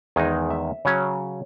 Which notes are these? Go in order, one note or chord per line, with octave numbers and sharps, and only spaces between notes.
E2 D#3 G#3 D#4 G#5
E5
C#3 F#3 C#4 C#5